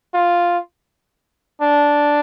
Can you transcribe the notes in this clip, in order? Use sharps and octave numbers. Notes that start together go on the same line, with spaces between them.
F4
D4